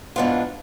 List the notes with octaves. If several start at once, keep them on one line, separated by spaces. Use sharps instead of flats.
G#2 E3 B3 D4 F4